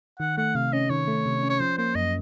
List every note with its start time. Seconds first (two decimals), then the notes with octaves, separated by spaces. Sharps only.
0.20 D#3 F#5
0.37 A3 F#5
0.55 C3 F5
0.73 C#4 D#5
0.90 D#3 C#5
1.08 A3
1.26 C3
1.43 C#4
1.50 C#5
1.60 F3 C5
1.78 A#3 C5
1.95 F#2 D#5